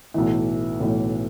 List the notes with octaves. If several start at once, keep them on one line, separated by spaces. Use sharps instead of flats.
B1 A2 E3
B1 A2 E3